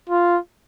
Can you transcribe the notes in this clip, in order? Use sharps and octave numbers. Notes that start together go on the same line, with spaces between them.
F4